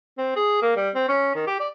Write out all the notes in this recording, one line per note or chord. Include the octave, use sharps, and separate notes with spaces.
C4
G#4
A#3
G3
C4
C#4
D#3
G4
D5